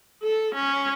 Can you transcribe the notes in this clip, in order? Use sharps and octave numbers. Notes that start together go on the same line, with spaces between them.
A4
C#4